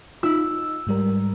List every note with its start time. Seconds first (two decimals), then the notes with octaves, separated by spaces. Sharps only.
0.23 D#4 F4 E6
0.87 G#2 G3 A#4